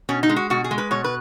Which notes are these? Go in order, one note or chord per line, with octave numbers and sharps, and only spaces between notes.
B2 C#4
D#4
G#3
F#4
B2 F#4
G#4
G#3
B4
B2 C#5
B4